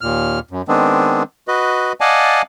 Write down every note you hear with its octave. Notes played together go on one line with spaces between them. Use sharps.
D#2 A#2 F6
F#2
D#3 G#3 B3 C4 D4
F#4 B4 D#5
D5 D#5 F5 F#5 G#5 A5